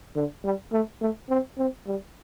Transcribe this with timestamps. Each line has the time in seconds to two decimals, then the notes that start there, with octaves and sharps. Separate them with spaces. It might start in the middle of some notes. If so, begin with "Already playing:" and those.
0.16 D3
0.44 G3
0.72 A3
1.01 A3
1.30 C4
1.58 C4
1.87 G3